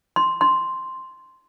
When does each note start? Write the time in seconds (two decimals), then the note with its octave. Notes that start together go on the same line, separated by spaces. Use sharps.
0.16 C6
0.41 C6